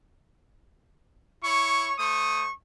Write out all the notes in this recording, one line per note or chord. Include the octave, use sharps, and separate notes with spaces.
E4 C#5 C#6
A3 C5 C#6 D#6